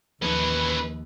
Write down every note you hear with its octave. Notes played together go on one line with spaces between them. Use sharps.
D#2 E3 F3 A#3 C#4 B4